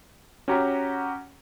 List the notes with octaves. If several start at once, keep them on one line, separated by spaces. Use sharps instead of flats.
C#4 F#4 G4 F#5 A#5